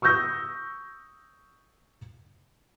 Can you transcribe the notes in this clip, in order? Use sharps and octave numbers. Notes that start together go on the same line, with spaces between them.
C#6 D#6 E6 G6 A#6